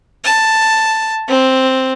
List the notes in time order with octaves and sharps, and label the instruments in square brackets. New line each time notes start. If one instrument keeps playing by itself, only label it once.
[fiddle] A5
C4